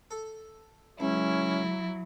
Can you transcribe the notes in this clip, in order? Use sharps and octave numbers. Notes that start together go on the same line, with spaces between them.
A4
C#2 F#3 C#4 E4